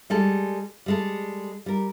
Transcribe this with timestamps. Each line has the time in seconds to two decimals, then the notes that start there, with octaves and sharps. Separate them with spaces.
0.10 G3 G#3 A4
0.86 G3 G#3 A4
1.66 G3 A#4